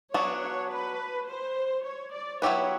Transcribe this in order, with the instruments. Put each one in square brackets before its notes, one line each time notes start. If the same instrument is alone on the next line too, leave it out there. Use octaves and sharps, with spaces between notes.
[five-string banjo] F#3 B3 D4 [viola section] C#5
[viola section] C#5
B4
C5
C#5
D5
[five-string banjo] F#3 B3 E4 G4 B4 [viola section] C#5